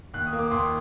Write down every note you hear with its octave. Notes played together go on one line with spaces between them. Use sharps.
D#2 F#6
D#6
A#3
D6
D#2 C6 D#6